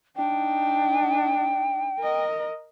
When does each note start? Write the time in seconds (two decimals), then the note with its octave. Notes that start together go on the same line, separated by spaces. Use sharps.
0.17 D4 D#4 G5
2.00 A#4 D#5